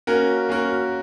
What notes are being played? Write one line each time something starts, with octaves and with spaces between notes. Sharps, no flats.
A#3 C#4 F#4 A#4
A#3 C#4 F#4 A#4